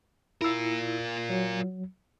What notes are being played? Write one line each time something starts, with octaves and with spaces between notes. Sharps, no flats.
E4 F4 A#4 E6
F#3